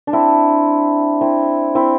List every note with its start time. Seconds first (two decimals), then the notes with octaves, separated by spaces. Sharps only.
0.07 D4
0.13 C4 E4
1.21 C4 E4
1.75 C4 E4